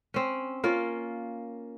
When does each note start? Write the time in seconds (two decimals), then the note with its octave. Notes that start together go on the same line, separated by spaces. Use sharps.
0.14 C4 C#4
0.64 A#3 C#4 F4